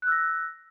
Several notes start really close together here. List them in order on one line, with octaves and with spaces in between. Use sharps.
F#6 E6 A#6